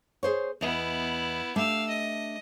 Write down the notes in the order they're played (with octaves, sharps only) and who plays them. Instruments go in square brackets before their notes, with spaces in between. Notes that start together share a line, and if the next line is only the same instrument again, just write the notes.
[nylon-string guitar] G#4 C5 C#5
[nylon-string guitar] E2 D#5 [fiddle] B3 E4
[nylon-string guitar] A3 D4 G4 [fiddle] F5 E6
[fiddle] D#5